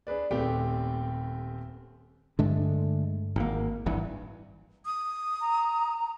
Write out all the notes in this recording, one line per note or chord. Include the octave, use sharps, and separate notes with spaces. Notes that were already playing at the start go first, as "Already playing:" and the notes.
D4 G#4 B4 D5
D#1 A3 B3 C4 G4 G5
G2 D3 G#3 A3 D4
G#1 A#3
G#1 G2 E3
D#6
A#5